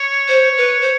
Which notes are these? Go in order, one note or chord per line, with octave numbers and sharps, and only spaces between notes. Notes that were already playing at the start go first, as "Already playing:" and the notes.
Already playing: C#5
C5
B4
C5